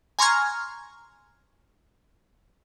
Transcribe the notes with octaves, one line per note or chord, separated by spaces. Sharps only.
G#5 A#5 C6 C#6 F6 G#6